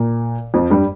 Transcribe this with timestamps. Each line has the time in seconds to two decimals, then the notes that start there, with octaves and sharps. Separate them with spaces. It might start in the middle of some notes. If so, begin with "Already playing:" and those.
Already playing: A#2 A#3
0.54 F2 F3
0.70 G2 G3